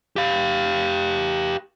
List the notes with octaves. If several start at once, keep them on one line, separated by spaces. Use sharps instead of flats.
G4 F5